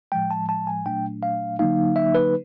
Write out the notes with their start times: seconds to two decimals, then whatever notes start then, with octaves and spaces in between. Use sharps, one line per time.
0.12 A2 F3 G#3 G5
0.31 A5
0.49 A5
0.67 G#5
0.86 A#2 F#3 A3 D4 G5
1.23 F5
1.59 D3 F#3 A#3 D#4 F5
1.96 E5
2.15 B4